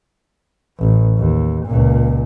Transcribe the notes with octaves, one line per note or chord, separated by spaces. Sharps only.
A1
D#2
C#2 A#2